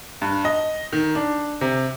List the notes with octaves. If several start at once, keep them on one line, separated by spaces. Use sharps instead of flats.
G2
D#5
D#3
D4
C3